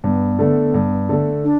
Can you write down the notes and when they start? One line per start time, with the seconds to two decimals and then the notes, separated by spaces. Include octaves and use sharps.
0.04 G2 B3
0.39 D3 A3
0.74 G2
1.09 D3 A3
1.44 D4